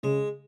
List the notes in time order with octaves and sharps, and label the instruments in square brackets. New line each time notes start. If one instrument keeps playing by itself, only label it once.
[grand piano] C#3 [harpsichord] G#3